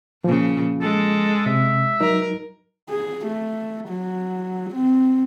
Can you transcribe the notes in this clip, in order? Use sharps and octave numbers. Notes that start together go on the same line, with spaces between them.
A#2 C#3 F3
G#3 A4
C3 E5
F#3 D#4 A#4
G#4
A3
F#3
C4